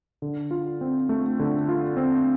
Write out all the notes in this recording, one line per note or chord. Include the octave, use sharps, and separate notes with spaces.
D3
F4
C4
A3
D3
F4
C4